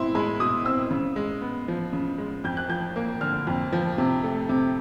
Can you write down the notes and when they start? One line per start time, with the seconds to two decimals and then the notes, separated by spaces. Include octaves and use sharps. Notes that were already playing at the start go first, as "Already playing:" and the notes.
Already playing: B2 C4 E4 C6
0.15 G#3 B5
0.40 B2 D#6
0.65 C4 E6
0.91 C#3
1.16 G#3
1.42 B3
1.68 F3
1.93 C#3
2.18 G#3
2.44 F2 G6
2.57 F#6
2.69 F3 G6
2.96 A#3
3.21 D3 F6
3.47 F2
3.73 F3
3.98 C3
4.23 A3
4.49 C3